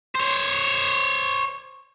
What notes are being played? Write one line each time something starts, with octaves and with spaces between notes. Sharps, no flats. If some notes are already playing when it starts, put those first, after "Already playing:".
C5 C#5